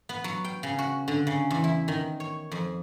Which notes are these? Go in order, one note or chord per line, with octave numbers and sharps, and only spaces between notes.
B3
F#3
G5
C#3
F#4
D3
C#3
E2
E4
D#3
C#5
F2